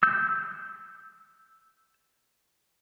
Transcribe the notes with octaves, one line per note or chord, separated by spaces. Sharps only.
E6 G6